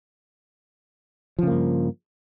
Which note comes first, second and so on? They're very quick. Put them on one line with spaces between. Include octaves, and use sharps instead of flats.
F3 C#3 A#3 G2